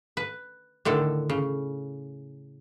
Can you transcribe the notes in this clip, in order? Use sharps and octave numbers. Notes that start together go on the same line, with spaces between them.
B4
A2 D3 D#3 A4
C#3